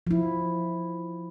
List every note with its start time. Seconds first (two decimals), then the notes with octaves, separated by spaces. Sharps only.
0.07 F3 E4